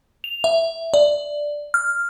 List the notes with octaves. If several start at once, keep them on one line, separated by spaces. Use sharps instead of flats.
F7
E5
D5
F6